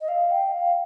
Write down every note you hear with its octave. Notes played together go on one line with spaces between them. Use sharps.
D#5
F5
G5
F5